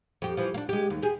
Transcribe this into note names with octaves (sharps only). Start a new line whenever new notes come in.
F2 G4
E3 F3
A#3 D4
G#3 G4
D#2
G4 G#4